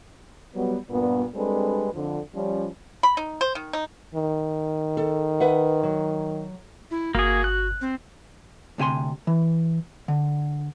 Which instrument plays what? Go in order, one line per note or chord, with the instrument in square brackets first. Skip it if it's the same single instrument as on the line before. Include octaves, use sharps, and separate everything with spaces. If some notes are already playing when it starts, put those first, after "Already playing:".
[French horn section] F#3 G3 B3
G2 A#2 B3
G3 G#3 C4 D4 A4 B4
F2 D3
F3 G3 C#4
[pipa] B5
D#4
C5
D#3
D#4
[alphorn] D#3
[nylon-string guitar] A4
B4 E5 F#5
F#3
[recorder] E4
[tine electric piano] G1 [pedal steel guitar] A#3 G#4 [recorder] F#4
[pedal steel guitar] F#6
[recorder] C4
[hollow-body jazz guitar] D2 C3 F4 G#5 C6
E3
D3